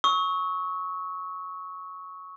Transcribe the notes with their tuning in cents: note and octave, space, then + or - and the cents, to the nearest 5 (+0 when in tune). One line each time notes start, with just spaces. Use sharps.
C#6 +0 E6 -45